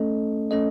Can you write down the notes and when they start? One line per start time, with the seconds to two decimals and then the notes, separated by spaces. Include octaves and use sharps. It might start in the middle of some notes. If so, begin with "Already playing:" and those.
Already playing: A3 C#4 A4 D#5
0.51 A3 C#4 A4 D#5